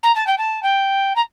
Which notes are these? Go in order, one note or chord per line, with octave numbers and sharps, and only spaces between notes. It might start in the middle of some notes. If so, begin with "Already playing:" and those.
A#5
A5
G5
A5
G5
A#5